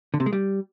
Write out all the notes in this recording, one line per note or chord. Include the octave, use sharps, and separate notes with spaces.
D3
C3
G#3
G3